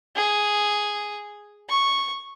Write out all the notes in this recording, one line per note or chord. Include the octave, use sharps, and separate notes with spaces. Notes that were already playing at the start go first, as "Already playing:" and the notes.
G#4
C#6